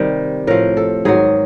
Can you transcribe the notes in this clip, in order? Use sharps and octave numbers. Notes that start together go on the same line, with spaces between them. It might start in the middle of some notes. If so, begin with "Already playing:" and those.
Already playing: C3 D#3 G3
A2 F3 A#4
A4
G#2 D#3 F#3 G#4